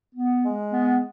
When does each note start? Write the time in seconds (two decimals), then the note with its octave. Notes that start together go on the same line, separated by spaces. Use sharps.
0.14 B3
0.44 G#3
0.72 B3